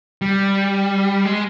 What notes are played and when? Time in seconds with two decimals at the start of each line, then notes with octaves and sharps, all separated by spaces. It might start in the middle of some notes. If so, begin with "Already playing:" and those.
0.22 G3
1.25 G#3